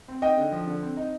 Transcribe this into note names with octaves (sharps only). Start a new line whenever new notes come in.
C4
D#4 D#5 G5
D3
F3
D3
C4
D#4